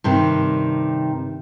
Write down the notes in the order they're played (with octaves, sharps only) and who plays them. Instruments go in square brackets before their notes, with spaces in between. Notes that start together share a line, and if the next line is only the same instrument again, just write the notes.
[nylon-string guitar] G2 C3 D#3